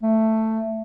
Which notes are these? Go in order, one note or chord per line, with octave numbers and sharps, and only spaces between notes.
A3